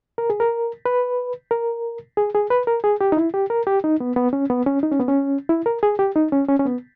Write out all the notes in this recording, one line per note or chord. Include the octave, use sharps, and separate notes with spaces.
A#4
G#4
A#4
B4
A#4
G#4
G#4
B4
A#4
G#4
G4
D#4
E4
G4
A#4
G4
D#4
B3
B3
C#4
B3
C#4
D#4
C#4
B3
C#4
E4
A#4
G#4
G4
D#4
C#4
C#4
C#4
B3